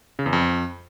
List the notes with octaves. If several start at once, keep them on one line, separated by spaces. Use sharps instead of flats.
C#3
E2
F2